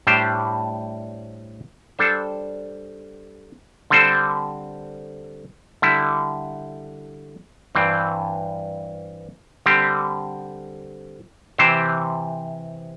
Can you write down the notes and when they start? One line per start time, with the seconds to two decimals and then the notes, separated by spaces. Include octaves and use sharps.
0.07 A2 G3 D4 G4 C5
1.99 G3 D4 A4 C5
3.90 D3 G3 C4 A4 C5
5.82 D3 G3 E4
7.75 G2 E3 C4
9.66 D3 G3 C4 G4
11.58 C3 E3 C4 G4 C5